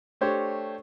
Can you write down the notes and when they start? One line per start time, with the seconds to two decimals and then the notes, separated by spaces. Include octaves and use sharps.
0.21 A3 D4 G4 C5 C#5